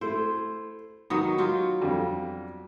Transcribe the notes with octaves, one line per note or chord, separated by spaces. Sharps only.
A3 E4 C5
D#3 F#3 B3 D#6
F#3 F4 G4
F2 D3 G3